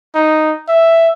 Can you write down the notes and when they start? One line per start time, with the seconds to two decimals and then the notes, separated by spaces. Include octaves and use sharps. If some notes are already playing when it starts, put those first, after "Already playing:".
0.15 D#4
0.68 E5